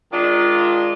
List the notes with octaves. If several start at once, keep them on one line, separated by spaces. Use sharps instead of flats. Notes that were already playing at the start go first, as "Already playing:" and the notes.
D#3 G#3 D4 F4